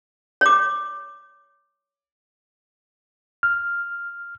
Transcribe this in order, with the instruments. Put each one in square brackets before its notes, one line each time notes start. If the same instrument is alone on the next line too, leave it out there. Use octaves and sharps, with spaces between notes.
[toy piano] C#5 D6
[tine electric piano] F6